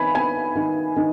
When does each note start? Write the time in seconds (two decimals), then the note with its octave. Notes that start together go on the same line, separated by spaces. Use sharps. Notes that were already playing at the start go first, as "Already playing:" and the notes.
Already playing: D#3 B3 G#5 B5
0.15 B3 G#5
0.55 D#3
0.96 D#3